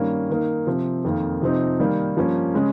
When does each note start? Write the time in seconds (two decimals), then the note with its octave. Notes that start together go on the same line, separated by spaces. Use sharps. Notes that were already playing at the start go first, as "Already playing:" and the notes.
Already playing: G2 D#3 A#3 C#4
0.29 D#3 A#3 D#4
0.67 C3 F3 C4
1.04 F2 D#3 A#3
1.42 C3 F3 C4 D#4
1.79 D#3 G3 A#3
2.16 G2 F3 A#3 C#4
2.54 C#3 G#3 C#4